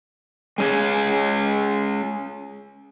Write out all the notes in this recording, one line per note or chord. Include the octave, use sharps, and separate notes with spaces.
G#3 C#4 G#4